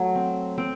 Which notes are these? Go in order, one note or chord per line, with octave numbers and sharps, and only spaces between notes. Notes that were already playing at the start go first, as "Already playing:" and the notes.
Already playing: F#3 A3 F5
C4
C4